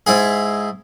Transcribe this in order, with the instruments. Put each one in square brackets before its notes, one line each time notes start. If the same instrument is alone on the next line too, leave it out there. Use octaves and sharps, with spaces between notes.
[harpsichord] G#2 E4 G#4